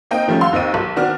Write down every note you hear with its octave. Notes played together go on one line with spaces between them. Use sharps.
A#3 C4 D#4 D#5 G5
D#3 F3 G3 A3 C#4
F5 F#5 C6 E6
D#2 C4 D#5 D#7
B1
D#3 B3 C4 D4 F#4 F6